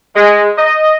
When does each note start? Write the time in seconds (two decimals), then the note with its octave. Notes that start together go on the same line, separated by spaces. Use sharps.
0.15 G#3
0.57 D#5